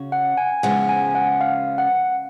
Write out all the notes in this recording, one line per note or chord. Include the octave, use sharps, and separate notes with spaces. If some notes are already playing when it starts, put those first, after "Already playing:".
Already playing: C#3 C#4 F#4
F#5
G#5
C#3 F3 G#3 B3 F#5
G#5
F#5
F5
F#5